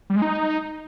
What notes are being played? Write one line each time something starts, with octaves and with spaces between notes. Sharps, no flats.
G3
G#3
D#4